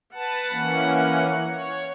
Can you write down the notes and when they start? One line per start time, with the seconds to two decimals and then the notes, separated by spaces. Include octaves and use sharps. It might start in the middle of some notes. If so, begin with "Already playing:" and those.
0.14 B4 F#5 A5
0.51 E3 A#3 C#4
1.49 C#5